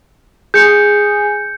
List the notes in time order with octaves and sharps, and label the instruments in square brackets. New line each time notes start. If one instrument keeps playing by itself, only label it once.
[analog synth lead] G#4 [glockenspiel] G6 C#7